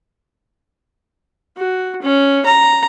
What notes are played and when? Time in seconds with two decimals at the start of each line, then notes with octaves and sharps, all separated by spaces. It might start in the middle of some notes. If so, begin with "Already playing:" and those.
1.57 F#4
2.02 C#4
2.46 A#5